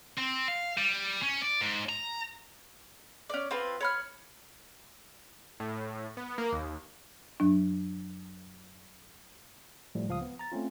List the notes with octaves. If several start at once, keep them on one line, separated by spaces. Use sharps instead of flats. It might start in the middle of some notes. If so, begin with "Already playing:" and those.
C4
F5
G3
C#4
D5
G#2
A#5
C#4 D5
C4 F4 B4
C#5 B5 F6
A2
B3
A#3
D#2
F#2 F#3 D4
A2 F3 G3 A3
C#2 F3 F5 D#6
B3
A#5 A6
A3 C4 C#4 F4